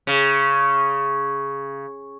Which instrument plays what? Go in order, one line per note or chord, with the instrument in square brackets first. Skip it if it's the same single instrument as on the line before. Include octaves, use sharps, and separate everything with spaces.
[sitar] C#3